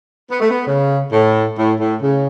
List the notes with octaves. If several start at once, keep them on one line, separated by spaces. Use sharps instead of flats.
B3
A3
B3
C#3
A2
A2
A2
C#3